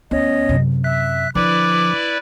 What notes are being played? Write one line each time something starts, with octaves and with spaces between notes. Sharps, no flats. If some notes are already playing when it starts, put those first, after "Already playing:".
D2 B3 C#4 C#5 D#5
F#2 C3
E5 F#6 B6
D3 F3 E4 B4 D5 D6